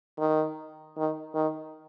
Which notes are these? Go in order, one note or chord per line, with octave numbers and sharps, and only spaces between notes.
D#3
D#3
D#3